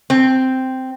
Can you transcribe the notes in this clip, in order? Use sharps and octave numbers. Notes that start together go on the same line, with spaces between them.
C4